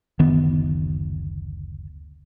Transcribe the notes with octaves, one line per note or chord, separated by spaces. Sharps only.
F#1 D2 D#3 B3